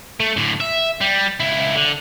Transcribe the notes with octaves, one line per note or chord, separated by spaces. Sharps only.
A3
A2 D3
E5
G3
C#2 E4
D3